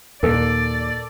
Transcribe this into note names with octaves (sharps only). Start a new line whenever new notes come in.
D#2 A#2 A4 D5